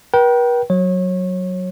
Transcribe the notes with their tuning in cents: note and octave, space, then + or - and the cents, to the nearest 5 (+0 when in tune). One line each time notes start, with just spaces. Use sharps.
B4 -45 G5 -25
F#3 +0 C#5 -25